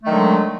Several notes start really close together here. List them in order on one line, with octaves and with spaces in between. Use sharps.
A3 D#3 F#3 D3 G#3